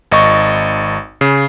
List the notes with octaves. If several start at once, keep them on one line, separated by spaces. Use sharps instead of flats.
G#1 D#5 C#6
C#3